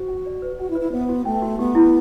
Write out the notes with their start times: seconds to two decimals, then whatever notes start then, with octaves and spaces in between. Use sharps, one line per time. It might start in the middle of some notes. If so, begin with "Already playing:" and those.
Already playing: F#4 C5
0.08 F#5
0.26 D5
0.42 B4
0.59 F#4 F#5
0.70 E4
0.75 B4
0.80 E4
0.92 B3 C5
1.09 F#4
1.25 A3 G5
1.42 F#4
1.59 B3 G4
1.75 E4